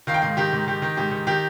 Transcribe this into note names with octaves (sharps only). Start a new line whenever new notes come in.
D#3 F5
G5
G#2 F5
D#3 G4
G#2
D#3 G4
D#3
G#2 G4
D#3
D#3 G4